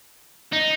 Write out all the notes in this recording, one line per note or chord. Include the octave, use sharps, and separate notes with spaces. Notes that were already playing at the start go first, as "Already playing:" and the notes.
D#4